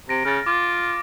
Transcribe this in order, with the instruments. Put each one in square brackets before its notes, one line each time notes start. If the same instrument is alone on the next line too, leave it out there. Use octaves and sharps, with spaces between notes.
[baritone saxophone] C3 [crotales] A#6 D7
[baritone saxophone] C#3 [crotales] F6 A6
[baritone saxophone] F4 [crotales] D6